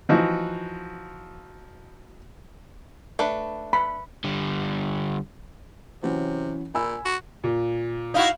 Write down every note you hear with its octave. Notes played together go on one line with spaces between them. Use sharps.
E3 F3 D#4 F#4
A3 D4 B4
B5
D3 G3
C3 E3 F#3 C#4
A#2 G#5 B5 E6
F#4
A#2
D#4 E4 F#4 F5